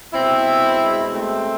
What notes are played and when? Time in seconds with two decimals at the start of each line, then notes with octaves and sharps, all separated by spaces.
0.13 B2 G#3 C4 E4
0.80 B2 G#3
1.13 A3 C4